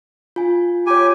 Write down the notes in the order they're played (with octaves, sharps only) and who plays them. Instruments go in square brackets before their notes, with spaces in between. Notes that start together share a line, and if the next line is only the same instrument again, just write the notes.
[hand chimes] F4 G#5
[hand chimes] F4 C#5 [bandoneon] G4 G#5